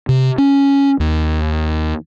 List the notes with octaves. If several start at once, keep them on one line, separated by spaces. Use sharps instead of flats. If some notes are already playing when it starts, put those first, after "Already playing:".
C3
C#4
D#2